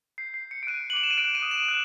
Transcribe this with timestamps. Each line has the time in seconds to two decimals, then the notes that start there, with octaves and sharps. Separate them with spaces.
0.18 G6 C7
0.34 C7
0.42 G6
0.51 C#7
0.63 D7
0.67 F#6 D#7
0.90 F#7
0.93 D6 F7
1.03 E7
1.11 D#7
1.17 F#6 D7
1.35 D#7
1.42 D#6
1.51 E7
1.68 F#6